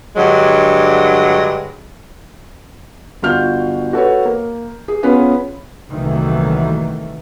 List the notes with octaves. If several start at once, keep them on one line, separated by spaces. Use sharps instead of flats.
G2 D3 F#3 G#3
G1 F4 F#4 F6 G6
F#4 A4 B4 C#5
A#3
G#4
B3 C#4 F4 G#4 B4 G#5
C2 A#2 D#3 E3 F#3 A3